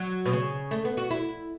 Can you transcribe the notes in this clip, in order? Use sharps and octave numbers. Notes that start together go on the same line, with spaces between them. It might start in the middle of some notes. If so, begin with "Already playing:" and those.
Already playing: F#3
B2
C#3
A3
B3
F#4
E4